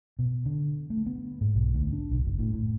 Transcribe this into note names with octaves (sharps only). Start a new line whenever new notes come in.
B2
D3
A3
B3
G#2
B1
D2
D4
B1
F#1
A2
A2